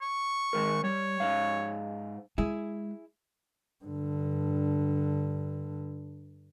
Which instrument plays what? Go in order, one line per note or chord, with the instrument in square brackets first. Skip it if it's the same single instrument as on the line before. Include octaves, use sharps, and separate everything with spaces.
[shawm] C#6
[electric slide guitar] D#3 G#3 A#4
[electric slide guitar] G3 [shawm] C#5
[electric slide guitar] G#2 F5
[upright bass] G#3 [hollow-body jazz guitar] E4 G#4
[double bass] G2 D3